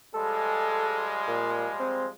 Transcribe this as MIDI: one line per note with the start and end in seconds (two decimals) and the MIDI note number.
0.15 2.11 53
0.15 2.11 55
0.15 2.11 56
0.15 1.16 69
1.28 1.68 46
1.79 2.07 60